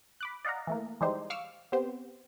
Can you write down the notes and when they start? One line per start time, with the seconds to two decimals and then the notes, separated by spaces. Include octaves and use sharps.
0.21 B5 D6 F#6
0.45 D5 D#5 F5 F#5 A#5
0.67 E3 A3 A#3
1.01 E3 G3 G#3 D#4 G4 C5
1.30 F5 C#6 D6 E6 F6
1.72 B3 C4 G4 C5